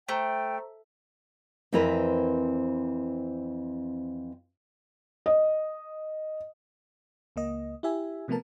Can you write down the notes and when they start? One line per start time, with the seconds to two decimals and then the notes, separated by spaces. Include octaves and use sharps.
0.09 A3 C5 G5 A#5
1.72 F2 E3 C4 E4 A#4 B4
5.26 D#5
7.36 C#2 A#3 D#5
7.83 E4 G4 E5 G#5
8.28 C3 F3 A3 B3 A#4 A5